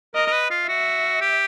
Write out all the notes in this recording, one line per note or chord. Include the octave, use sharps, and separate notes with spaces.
A#4 D#5
A#4
B4
F4
F#4 E5
G4